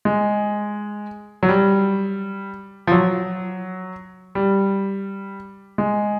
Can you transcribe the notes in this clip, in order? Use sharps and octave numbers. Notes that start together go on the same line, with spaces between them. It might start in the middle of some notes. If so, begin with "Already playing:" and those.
G#3
F#3
G3
F3
F#3
G3
G#3